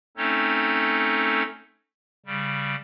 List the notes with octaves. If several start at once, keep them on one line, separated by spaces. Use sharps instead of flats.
A3 C4 C#4 D#4 A4 C#5
C#3 G3